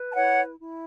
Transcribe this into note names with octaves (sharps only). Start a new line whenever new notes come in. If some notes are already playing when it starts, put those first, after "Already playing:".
Already playing: B4
A5
E4 C#5 F#5
E4